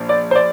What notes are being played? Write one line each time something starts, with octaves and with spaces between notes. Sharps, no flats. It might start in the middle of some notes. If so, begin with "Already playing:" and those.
Already playing: A#1 A#2
D5
C5
D5